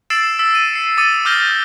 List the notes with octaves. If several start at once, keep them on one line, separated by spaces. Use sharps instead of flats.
E6 A6 C7 D7 E7 F#7
E6 B6
D#7
C7 C#7
D6 D#6 A6 C#7 D#7
D6 F6 G6 A#6 G7